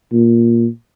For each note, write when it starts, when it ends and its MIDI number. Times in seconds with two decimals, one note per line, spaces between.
0.13 0.66 46